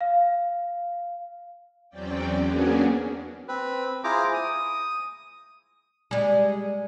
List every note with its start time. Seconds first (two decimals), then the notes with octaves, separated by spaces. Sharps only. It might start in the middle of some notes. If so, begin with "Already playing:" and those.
0.01 F5
1.90 E2 F#3 C4 C#4 D5 G5
2.40 A#3 B3 C#4 D4 F#4 G#4
3.48 C4 B4
4.04 E4 F4 G#4 C5 A#5 D6
4.34 D#6
6.11 G3 G#3